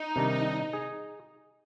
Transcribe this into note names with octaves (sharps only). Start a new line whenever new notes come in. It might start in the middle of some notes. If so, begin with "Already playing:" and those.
Already playing: D#4
C3 D#3 G3 D4
G#4